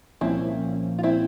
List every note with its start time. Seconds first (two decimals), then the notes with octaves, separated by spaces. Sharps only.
0.21 C2 A#2 F3 A#3 C4 C#4 E4
0.98 F4
1.03 C4 E4